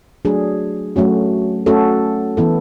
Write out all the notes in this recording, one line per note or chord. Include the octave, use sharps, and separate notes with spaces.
F#3 A3 D4 G#4
F#3 A3 C#4 F#4
A3 C#4 F#4 A4
E3 B3 E4 A4